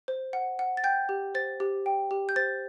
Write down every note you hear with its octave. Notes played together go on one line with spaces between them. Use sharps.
C5
F#5
F#5
A6
G5 G6
G4
C5 A6
G4
G5
G4
G6
C5 A6